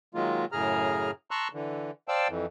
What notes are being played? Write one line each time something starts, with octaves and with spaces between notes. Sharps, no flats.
D#3 F#3 G#3 A#3 F4
F#2 A2 C#3 G#4 A#5 F6
A5 A#5 C6 C#6 E6 F#6
D3 E3
C5 D5 F5 G5 A5 E6
F2 E3